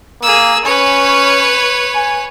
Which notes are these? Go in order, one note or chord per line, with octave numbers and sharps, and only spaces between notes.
A#3 G#4 E6
C#4 B4 C#5
G#5